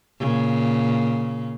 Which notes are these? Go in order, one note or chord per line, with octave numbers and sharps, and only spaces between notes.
A#2 C#3